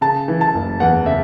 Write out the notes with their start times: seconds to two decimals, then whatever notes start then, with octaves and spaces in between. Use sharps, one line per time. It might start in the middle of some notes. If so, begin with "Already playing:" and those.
0.01 C#3 A5
0.28 E3
0.41 A5
0.54 F#1
0.80 E2 F#5
1.06 C#3 E5